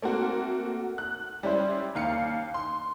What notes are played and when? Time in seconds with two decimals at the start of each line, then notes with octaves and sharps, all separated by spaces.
0.02 A3 A#3 C4 F#4
0.98 F#6
1.43 G3 C#4 E4 C5
1.95 D#2 F5 C#7
2.54 C6